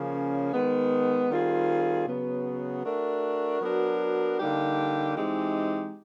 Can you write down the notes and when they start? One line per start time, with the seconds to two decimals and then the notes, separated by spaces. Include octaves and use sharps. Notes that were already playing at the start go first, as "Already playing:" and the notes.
Already playing: C#3 F3 A#3 C#4
0.53 D#3 G#3 B3
1.30 D#3 G3 C4 F4 G#4
2.07 C#3 F#3 B3
2.84 A3 D4 F#4 A#4
3.61 F#3 B3 D4 F#4 A#4
4.38 D3 G3 A#3 D#4 G4
5.16 E3 G#3 C4 D#4 G4